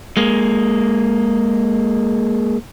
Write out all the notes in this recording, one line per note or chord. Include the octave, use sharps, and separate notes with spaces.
G#3 A#3